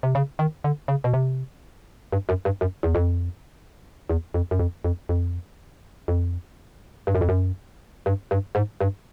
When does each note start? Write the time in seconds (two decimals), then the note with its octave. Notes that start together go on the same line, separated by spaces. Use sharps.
0.03 C3
0.15 C#3
0.39 D#3
0.64 D3
0.88 C#3
1.04 B2
1.13 C3
2.12 G2
2.29 F#2
2.45 G2
2.61 F#2
2.83 E2
2.95 F2
4.10 E2
4.34 F2
4.51 F#2
4.59 F2
4.84 F2
5.09 F2
6.08 F2
7.07 G2
7.15 F#2
7.21 F2
7.29 F#2
8.06 G2
8.31 G2
8.55 G#2
8.81 G2